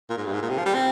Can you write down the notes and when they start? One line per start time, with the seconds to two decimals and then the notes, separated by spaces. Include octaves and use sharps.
0.10 A#2
0.17 G#2
0.26 G2
0.33 G#2
0.42 A#2
0.50 C3
0.58 F3
0.66 G3
0.74 C4